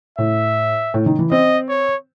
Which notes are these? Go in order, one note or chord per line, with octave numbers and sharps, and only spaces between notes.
A2 E5
A2
D#3
E3
C4 D#5
C#5